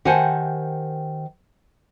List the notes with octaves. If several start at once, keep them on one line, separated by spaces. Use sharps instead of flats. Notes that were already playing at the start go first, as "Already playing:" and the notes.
D#3 G4 C5 F#5 G#5 A5